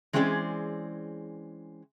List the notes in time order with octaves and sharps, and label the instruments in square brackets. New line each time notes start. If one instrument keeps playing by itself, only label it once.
[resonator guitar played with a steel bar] E3 G#3 C4 C#4 G#4 D5